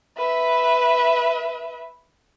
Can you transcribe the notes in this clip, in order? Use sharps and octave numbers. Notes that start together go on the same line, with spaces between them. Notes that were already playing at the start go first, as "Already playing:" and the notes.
B4 E5